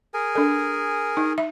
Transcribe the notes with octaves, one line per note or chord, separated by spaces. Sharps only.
G#4 A#4 G#5
D4 A4
D#4
E5